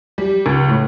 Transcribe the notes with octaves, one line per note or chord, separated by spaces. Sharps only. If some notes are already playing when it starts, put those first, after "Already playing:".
G3
C#2
A2